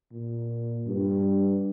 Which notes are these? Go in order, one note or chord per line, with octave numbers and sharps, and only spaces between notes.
A#2
G2